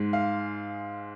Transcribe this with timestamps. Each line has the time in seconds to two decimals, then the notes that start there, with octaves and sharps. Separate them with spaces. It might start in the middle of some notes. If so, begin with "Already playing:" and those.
Already playing: G#2 G#3
0.13 F5